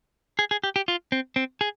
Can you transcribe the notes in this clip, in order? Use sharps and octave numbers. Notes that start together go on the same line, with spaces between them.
G#4
G#4
G4
G4
F4
C4
C4
G#4